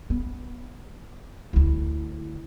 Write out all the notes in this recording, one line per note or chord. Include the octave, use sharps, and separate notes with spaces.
B3
D2 E4